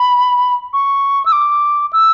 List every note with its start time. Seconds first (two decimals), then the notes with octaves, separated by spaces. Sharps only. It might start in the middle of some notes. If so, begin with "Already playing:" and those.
Already playing: B5
0.73 C#6
1.26 E6
1.32 D6
1.93 E6